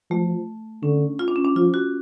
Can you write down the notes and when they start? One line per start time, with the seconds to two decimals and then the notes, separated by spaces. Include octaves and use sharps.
0.11 F3 A3
0.83 D3 C#4
1.19 F4
1.28 D4
1.36 C#4
1.44 D4
1.56 F3 F4
1.74 F#4